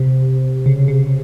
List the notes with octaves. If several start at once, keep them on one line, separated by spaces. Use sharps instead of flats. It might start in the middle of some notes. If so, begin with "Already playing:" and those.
Already playing: C3
C#3
C#3